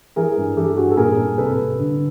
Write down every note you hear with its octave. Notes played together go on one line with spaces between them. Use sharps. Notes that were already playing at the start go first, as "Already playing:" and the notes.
E3 G#4 A#4
G2
E3 G4 A4
G2 F#4 G#4
A4
A#2 G#4 A#4
A#2
C2 A4 B4
C2
D3